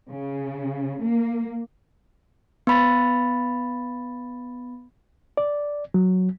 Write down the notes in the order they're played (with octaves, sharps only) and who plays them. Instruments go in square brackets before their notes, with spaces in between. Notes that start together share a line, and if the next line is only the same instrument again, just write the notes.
[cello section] C#3
A#3
[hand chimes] B3 B5 A6
[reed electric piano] D5
F#3